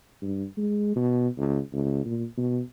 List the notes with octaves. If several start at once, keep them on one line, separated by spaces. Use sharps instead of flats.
G2
G#3
B2
C#2
C#2
A#2
B2